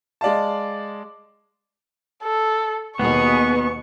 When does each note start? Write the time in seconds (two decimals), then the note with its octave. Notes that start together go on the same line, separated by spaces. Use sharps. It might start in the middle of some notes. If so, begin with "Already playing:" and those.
0.21 G#3 D5 F5 A5
2.24 A4
2.99 D#2 B2 B3 G#4 C#6